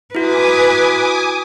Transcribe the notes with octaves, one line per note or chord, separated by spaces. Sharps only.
E4 F#4 B4 G#5 D6 D#6